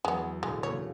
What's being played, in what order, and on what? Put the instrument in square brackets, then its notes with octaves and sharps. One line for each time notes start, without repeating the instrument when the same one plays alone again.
[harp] E2 F#3 [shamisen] G#3 B3
[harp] E1 D2 A2 [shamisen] G#3
[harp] C#3 A3 A#3 [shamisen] C#5